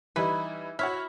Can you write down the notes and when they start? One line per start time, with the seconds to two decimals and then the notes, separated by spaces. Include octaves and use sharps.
0.16 E3 G3 D#4 E4 B4
0.79 E4 F#4 C#5 E5 F6